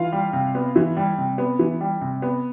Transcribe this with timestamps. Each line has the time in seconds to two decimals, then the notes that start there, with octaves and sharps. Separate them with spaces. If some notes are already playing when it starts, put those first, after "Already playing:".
Already playing: E3 F4 F5
0.12 G3
0.33 C3
0.55 B3
0.76 E3
0.97 G3
1.18 C3
1.38 B3
1.59 E3
1.81 G3
2.01 C3
2.22 B3